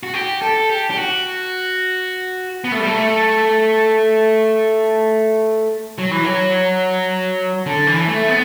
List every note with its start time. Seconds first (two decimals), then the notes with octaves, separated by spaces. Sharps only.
0.03 F#4
0.14 G4
0.42 A4
0.70 G4
0.91 G4
0.97 F#4
2.64 B3
2.72 A3
2.79 G3
2.86 A3
5.98 F#3
6.11 E3
6.24 F#3
7.66 D3
7.87 E3
8.08 A3
8.28 B3